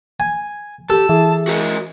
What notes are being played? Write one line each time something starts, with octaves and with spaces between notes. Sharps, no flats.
G#5
G4 A4 A5
E3 G#4
F#4 A#4 D#5